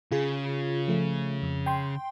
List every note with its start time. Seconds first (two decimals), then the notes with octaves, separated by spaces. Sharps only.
0.12 C#3 F4 G#4
0.88 F3 A3
1.42 F2
1.66 G5 C6